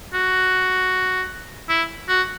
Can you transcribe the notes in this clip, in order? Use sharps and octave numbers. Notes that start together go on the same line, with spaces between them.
F#4
E4
F#4